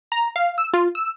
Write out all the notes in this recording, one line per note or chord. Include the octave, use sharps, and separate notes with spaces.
A#5
F5
E6
F4
E6